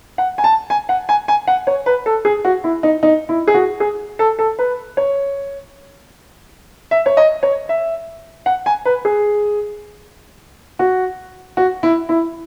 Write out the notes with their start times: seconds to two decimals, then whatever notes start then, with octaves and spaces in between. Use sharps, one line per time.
0.18 F#5
0.38 G#5
0.44 A5
0.70 G#5
0.89 F#5
1.09 G#5
1.28 G#5
1.47 F#5
1.67 C#5
1.86 B4
2.06 A4
2.25 G#4
2.45 F#4
2.64 E4
2.83 D#4
3.03 D#4
3.29 E4
3.47 G#4
3.54 F#4
3.80 G#4
4.19 A4
4.39 A4
4.59 B4
4.97 C#5
6.91 E5
7.06 C#5
7.17 D#5
7.43 C#5
7.69 E5
8.46 F#5
8.66 G#5
8.85 B4
9.05 G#4
10.79 F#4
11.57 F#4
11.83 E4
12.09 E4